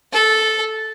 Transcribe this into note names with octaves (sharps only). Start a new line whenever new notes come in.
A4